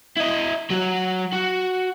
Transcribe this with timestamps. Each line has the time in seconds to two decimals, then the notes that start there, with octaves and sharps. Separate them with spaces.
0.17 E4 D#5
0.70 F#3 F#4
1.32 F#4